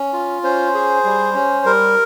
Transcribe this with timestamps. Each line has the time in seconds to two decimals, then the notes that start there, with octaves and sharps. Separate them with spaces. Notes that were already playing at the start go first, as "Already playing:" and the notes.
Already playing: C#4
0.13 F4
0.43 C#4 C5
0.74 G#4
1.04 G3
1.34 C#4
1.65 G3 A#4